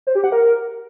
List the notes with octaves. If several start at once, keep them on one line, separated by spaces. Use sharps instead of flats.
C5
G4
F#5
A#4